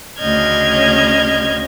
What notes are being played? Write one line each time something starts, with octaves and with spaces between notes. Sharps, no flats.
D2 C#3 D#5 F6 G6 G#6